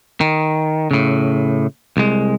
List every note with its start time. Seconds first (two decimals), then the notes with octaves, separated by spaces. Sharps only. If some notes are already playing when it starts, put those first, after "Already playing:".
0.21 D#3
0.91 A2 C#3
1.97 C2 G#3